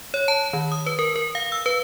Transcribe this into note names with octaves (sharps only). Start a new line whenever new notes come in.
C#5
A5
D#3
D#6
B4
A#4
A#4
F5
E6
B4